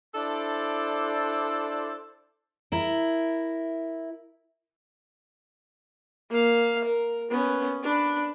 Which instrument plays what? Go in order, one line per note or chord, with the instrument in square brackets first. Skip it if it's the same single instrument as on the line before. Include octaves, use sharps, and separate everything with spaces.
[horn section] D4 E4 A4 C5 D5
[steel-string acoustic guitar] E4 A#4
[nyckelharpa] A#3 F5
A#4
B3 C#4
D4 B5